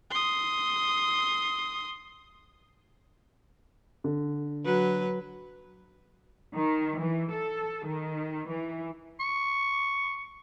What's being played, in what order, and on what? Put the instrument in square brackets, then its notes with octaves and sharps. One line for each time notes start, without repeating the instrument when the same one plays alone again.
[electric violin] C6 D#6
[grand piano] D3
[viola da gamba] F#3 B4
[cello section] D#3
E3
A4
D#3
E3
[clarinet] C#6